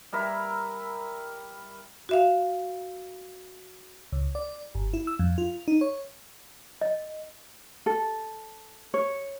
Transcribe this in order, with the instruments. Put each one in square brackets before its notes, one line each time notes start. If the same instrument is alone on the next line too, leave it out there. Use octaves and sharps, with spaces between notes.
[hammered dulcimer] G3 E4 A#4 E5
[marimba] F#4 E5 F5
[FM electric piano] C#2
D5
G1
E4
E6
F2
F4
D#4
C#5
[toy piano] D#5
[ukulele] A4
C#5